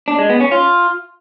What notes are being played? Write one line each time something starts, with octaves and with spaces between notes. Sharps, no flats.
D4
G#3
B3
C#4
F4